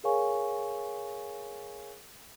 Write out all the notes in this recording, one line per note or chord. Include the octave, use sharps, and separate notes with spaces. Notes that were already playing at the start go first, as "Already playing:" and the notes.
G#4 A#4 C#5 F5 G#5 C#6